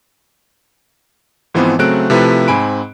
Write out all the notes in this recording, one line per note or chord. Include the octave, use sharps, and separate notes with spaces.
G#2 E3 F3 B3 C4
C#3 F#3 A3 C4 F#6 D7
C3 F3 A3 E4 B4
G#2 C4 G#5 B5 D7